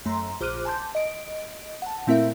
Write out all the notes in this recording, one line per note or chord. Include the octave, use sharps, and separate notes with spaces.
F#2 A3 A#5 C6
A#1 C5 D6 F6 F#6 D#7
G#5 A5 C6 D6 G6
D#5 D7
F#5 A5
A#2 A3 C4 E4 A#4 E5